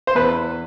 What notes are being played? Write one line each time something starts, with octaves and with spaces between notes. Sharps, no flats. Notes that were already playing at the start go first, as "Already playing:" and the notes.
C5
E2 B4